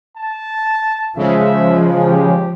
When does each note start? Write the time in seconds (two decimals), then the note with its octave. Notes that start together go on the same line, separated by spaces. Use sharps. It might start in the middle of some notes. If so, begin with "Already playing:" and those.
0.17 A5
1.17 C#3 F3 G#3 E5
2.06 G4